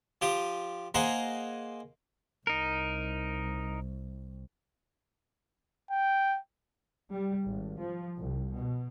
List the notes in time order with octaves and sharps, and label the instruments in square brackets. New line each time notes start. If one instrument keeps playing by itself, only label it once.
[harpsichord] F3 G4 D#6
A#3 G#4 C5 D#5 F#5 A#5
[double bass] C2 [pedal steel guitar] D#4 A#4
[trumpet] G5
[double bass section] G3
G#1
F3
C2
B2